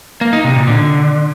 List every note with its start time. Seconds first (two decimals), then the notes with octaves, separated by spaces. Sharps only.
0.21 A#3
0.33 D#4
0.44 C3
0.56 A#2
0.67 D3